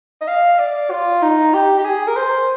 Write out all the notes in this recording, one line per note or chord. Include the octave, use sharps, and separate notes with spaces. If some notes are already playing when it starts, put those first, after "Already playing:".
D#5
F5
D5
F4
D#4
G4
G4
G#4
A#4
C5